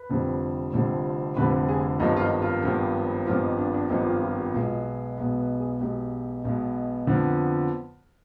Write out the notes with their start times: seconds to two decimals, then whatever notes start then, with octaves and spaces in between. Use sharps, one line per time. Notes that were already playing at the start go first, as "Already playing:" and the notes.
Already playing: B4
0.10 F1 F2 D3 G3 C4
0.73 F1 F2 D3 G3 C4
1.36 F1 F2 D3 G3 C4 B4
1.68 G#4
2.00 G#1 G2 F3 B3 D#4
2.17 F4
2.21 D#4
2.42 F4
2.63 G#1 G2 F3 B3
3.26 G#1 G2 F3 B3 F4
3.42 D#4
3.58 D4
3.74 D4
3.90 G#1 G2 F3 B3 D#4
4.06 F4
4.23 F4
4.39 G4
4.54 B1 B2 G#3 B3 F4
5.18 B1 B2 G#3 B3
5.38 B4
5.60 G#4
5.80 B1 B2 G#3 B3 G4
6.45 B1 B2 G#3 B3
7.07 F2 D3 F3 B3